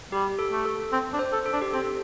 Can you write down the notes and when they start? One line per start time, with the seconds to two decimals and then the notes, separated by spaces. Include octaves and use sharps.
0.12 G3 G4
0.39 A4
0.52 A3
0.65 A4
0.93 C4
1.13 D4
1.19 C5
1.33 A4
1.46 A4
1.53 D4
1.62 G4
1.73 C4 A4